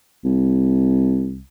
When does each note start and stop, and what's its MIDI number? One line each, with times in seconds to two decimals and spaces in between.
0.24 1.41 36